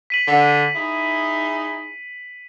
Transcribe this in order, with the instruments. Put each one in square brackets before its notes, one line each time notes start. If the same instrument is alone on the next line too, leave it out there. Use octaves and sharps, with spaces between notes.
[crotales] B6 D#7 F#7
[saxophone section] D3
D#4 E4 G#4